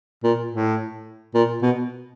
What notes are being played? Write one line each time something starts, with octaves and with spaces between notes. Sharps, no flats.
A#2
A2
A#2
B2